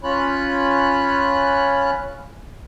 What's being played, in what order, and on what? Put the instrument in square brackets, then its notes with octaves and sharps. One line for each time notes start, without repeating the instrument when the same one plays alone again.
[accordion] C#4 F4 C#5 B5 F#6